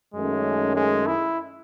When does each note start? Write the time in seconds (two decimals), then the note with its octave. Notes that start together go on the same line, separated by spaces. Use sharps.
0.14 F#2 D#3 G#3 A3 C#4
0.76 G#3
1.07 E4